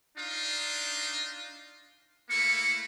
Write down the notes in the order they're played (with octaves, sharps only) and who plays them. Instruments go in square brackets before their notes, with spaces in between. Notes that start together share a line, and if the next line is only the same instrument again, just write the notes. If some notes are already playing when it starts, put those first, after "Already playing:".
[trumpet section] D4 D#4 F4
[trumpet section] A3 A#3 E4 [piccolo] C#7